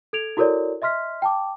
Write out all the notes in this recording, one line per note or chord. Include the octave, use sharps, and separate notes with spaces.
A4 G#6 D7 F7
E4 F#4 A4 A#4 C#5 D5
D#5 E5 C6 F6 B6
G5 A5 D6